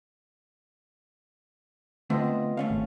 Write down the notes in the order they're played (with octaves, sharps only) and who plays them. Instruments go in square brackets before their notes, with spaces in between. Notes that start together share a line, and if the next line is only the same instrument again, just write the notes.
[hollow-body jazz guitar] D3 A3 C4 [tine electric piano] B3 F4 D#5
[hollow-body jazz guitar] A3 C#4 F5
[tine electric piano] G#1